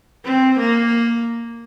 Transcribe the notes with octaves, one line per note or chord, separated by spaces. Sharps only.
C4
A#3